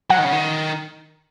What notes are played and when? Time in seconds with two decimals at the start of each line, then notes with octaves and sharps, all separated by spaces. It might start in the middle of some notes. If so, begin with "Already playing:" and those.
0.10 F#3 F#5
0.18 D#3
0.24 C#3
0.32 D#3